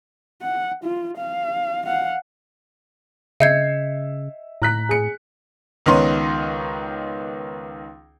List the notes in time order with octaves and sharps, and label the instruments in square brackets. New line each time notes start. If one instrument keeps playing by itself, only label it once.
[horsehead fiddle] F#5
F4
F5
F5 F#5
[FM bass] C#3 [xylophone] D#5 G6 G#6 [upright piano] E5 C7 C#7
[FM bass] A2 [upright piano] A#5 F#6 B6
[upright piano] G#4 C#7
[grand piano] C#2 D#3 B3 C#4 D#4 C6